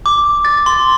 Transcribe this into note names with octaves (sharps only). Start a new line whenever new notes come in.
D6
A6
C6